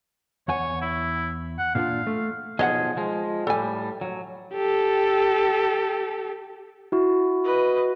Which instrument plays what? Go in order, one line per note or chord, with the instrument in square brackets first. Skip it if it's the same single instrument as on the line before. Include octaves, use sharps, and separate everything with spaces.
[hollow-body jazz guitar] E2 F#5 G#5 [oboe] C#5
[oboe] E4
F#5
[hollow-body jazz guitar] A#2 D4 F4 [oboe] F5
[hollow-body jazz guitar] A3
[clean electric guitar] B1 F3 G#4 [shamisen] D#5 F5 F#5
[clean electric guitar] F3 G#3
[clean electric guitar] A2 C#3 G3 [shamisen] A4 G#5
[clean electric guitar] F#3
[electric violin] G4 A4
[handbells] E4 F#4
[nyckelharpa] B4 D#5